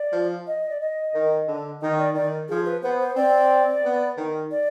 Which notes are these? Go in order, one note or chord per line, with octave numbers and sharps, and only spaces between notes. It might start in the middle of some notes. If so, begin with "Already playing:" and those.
Already playing: D5
F3
D#5
D5
D#5
D#3
D3
D#3 D#5
D5
D#3 D5
F3 G#4
B4
B3 C5
C5
C4 D5
B3
D#3
D5